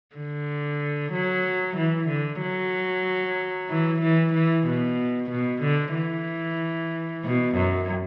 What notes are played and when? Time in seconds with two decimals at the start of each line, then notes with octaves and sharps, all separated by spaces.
0.16 D3
1.13 F#3
1.77 E3
2.08 D3
2.42 F#3
3.70 E3
4.02 E3
4.34 E3
4.67 B2
5.31 B2
5.63 D3
5.95 E3
7.24 B2
7.56 F#2